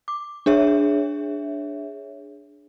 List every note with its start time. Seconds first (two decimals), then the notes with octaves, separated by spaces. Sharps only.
0.08 D6
0.46 D4 G#4 C#5 E5